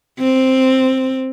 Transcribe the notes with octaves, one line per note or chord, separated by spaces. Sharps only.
C4